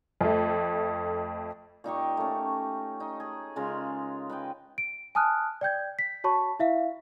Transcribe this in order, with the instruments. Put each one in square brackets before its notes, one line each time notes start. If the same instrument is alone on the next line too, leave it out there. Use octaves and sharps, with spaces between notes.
[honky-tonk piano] F2 A3
[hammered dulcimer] A#2 D#4 G4 C#6
A3 C#4
D#4
G#4
C#3 G#3 F4 A#4
B4 D#5 G5
[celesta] D7
G#5 A5 D#6 F6 F#6
D5 G5 G6 G#6
B6
F#4 C#5 A5 B5 C#6
E4 E5 F5